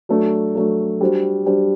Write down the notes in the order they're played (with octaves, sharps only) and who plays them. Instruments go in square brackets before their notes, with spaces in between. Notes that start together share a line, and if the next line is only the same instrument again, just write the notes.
[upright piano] F#3 A3 D4
F#3 A3 D4
G3 D4 F#4 C5
G3 D4 F#4 C5